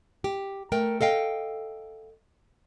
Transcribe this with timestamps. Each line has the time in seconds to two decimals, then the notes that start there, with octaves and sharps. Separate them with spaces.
0.24 G4
0.72 A3 A#4 G5
1.01 A4 D#5 F5 G5